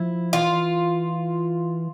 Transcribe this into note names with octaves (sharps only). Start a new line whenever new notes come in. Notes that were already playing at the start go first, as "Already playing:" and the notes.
Already playing: F3 E4
E3 F4